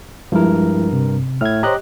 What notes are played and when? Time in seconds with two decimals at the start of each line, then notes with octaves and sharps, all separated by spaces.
0.32 G2 F3 G#3 E4 A#4
0.93 C3
1.41 A2 E5 F6 G#6
1.63 G4 C5 C#5 D#5 A#5 F#6